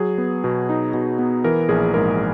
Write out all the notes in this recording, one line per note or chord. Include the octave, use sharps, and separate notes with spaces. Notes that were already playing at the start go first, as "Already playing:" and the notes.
Already playing: F#3 G#4
B3
B2
D#4
B2
B3
E3 A#4
A#1 G#4
G#2 A#4